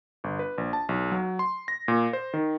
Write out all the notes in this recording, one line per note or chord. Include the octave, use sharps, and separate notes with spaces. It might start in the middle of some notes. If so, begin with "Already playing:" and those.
G1
B4
A#1
A5
B1
F#3
C6
A#6
A#2
C5
D#3